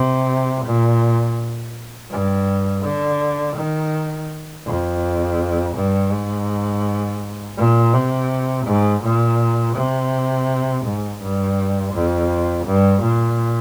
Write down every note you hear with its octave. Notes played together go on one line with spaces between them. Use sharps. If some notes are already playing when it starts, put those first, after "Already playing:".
Already playing: C3
A#2
G2
D3
D#3
F2
G2
G#2
A#2
C3
G#2
A#2
C3
G#2
G2
F2
G2
A#2